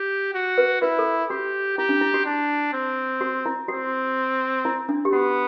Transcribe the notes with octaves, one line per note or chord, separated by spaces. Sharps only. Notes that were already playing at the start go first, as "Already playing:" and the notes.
Already playing: G4
F#4
B4
E4 B4
A4
F#4 G4
E4 G4
D4
E4
F#4
D4
C4
F#4
E4
C4 F#4
E4
D4
G4
B3 F#4